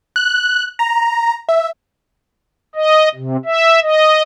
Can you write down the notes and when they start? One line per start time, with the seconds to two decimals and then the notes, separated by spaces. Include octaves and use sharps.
0.16 F#6
0.79 A#5
1.49 E5
2.75 D#5
3.15 C3
3.45 E5
3.83 D#5